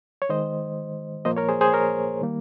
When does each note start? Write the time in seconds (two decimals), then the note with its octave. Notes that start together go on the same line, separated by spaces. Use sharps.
0.22 C#5
0.29 D#3 G#3 C5 D#5
1.25 A#2 F3 A#3 C5 D#5
1.37 A#4 C#5
1.49 G#4 C5
1.61 G#4 C5
1.73 A#4 C#5
2.21 D#3 G3 A#3